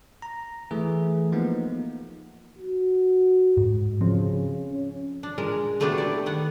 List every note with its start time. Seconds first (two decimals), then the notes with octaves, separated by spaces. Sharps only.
0.22 A#5
0.71 E3 A3 G#4
1.32 F3 A#3 B3 D#4
2.58 F#4
3.57 G#2
4.01 C#3 F3 C4
4.70 C#4
5.23 D4
5.38 A#2 G#3 A#4
5.80 F#3 A3 B3 D4 G4 A4
5.98 E4 D5
6.26 D#3 B3 F#5